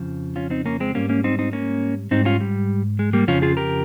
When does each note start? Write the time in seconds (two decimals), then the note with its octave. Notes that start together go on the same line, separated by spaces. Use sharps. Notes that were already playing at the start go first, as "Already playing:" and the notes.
Already playing: F2 C#3 F3
0.36 C#4 F4
0.50 C4 D#4
0.66 A#3 C#4
0.80 G#3 C4
0.95 G#2 G3 A#3 C#4
1.09 A#3 C#4
1.24 C4 D#4
1.39 C4 D#4
1.53 A#3 C#4
2.11 G#2 G3 C4 D#4
2.25 C#4 F4
2.41 G3
2.99 G#3
3.13 G3 A#3
3.27 F2 C#3 F3 C#4 F4
3.42 F4 G#4
3.57 G4 A#4